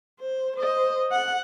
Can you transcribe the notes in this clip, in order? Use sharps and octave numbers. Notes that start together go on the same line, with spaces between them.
C5
C5 D#5
F#5